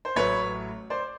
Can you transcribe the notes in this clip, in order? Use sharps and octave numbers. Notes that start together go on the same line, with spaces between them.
C5
A1 A2 F#3 A3 B4 C#5
C5 D5